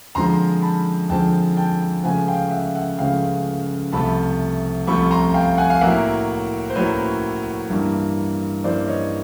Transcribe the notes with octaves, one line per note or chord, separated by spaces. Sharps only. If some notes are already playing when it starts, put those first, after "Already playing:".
F2 D3 F3 G#3 A#5 C6
A5 B5
F2 D3 F3 G#3 G5 A5
G5 A5
C#2 C#3 F3 A3 F#5 G#5
F5 G5
E5 F#5
E5 F#5
C#2 C#3 F3 A3 F5 G5
C2 C3 F3 A3 A5 B5
C2 C3 F3 A3 B5 C#6
A#5 C6
F5 G5
F#5 G#5
F5
A2 F#3 A#3 E5 F#5
C5
A2 F#3 A#3 B4 C#5
G2 E3 G3 A#3
G2 E3 G3 A#3 C5 D5
C#5 D#5